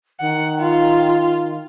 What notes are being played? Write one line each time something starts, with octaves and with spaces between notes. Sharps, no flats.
D#3 F#5
F4